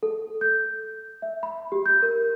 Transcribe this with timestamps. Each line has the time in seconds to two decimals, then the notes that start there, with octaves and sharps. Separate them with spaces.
0.03 A4
0.41 G6
1.22 E5
1.43 B5
1.72 G4
1.86 G6
2.02 A#4